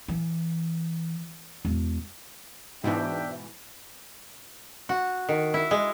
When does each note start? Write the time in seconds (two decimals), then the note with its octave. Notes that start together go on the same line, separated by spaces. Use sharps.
0.08 E3
1.65 E1
2.84 G#2 B2 E3 D4 E5 G5
4.89 F#4
5.29 D#3
5.54 E4
5.71 G#3